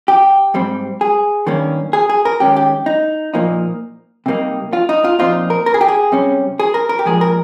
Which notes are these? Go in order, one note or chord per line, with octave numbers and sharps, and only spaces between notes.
G4
G#2 G3 C4
G#4
G2 D#3 A#3 C#4
G#4
G#4
A#4
D#3 G#3 C#4 G4
G4
D#4
A#2 F3 A#3 D#4
C3 G3 A#3 D#4
F4
D#4
F4
A#2 F3 C4 D#4 F4
A#4
A#4
G#4
G4
G#4
C3 G3 C#4
G#4
A#4
A#4
G4
A#2 F3 G#3 G#4
A#4